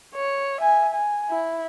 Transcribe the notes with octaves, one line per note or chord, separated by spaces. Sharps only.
C#5
E5 G#5
G#5
E4